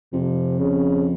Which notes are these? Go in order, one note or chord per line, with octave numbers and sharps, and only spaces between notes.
F2 C3
C#3